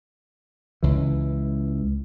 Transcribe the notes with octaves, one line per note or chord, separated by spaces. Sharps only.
C#2 E3